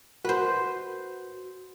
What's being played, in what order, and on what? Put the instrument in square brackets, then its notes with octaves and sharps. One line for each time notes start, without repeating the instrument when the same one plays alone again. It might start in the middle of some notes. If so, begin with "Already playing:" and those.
[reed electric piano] F#4 [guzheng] B4 C5